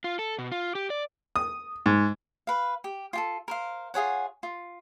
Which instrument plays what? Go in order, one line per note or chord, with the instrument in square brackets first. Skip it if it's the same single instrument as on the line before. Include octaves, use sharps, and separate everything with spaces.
[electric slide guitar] F4
A4
B2
F4
G4
D5
[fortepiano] D#6
G#2
[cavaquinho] B4 F5
G4
F4 G4 A4
A#4 C5 F5
F4 G#4 C#5 F#5
F4